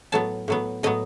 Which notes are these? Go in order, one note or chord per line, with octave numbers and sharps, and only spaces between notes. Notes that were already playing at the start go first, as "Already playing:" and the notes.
A2 F#3 B3 A5
A2 F#3 B3
A2 F#3 B3 D#5